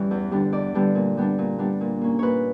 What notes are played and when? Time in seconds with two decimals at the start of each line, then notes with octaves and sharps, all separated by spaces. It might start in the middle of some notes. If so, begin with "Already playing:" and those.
Already playing: G2 E3 G3 C#4 C#5
0.11 E2
0.31 D3 G3 B3 D4
0.52 E2 D5
0.75 D3 G3 B3 D4
0.95 A#2
1.17 G3 B3 D4
1.38 A#2
1.59 G3 B3 D4
1.81 A#2
2.01 A#3 C#4
2.19 A#2 B4 C#5